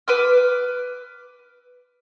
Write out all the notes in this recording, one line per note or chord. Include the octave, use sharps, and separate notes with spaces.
B4 D6 E6 F6